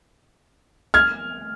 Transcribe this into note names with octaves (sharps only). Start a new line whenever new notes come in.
F6 G#6